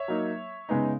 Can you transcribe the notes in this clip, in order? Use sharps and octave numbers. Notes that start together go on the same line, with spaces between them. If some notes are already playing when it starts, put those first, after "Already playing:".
Already playing: C#5 E5
F#3 A#3 D#4
C#3 G#3 B3 D#4